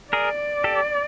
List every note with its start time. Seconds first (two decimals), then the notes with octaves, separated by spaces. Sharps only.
0.12 G#4 A#4 D5
0.64 G4 A4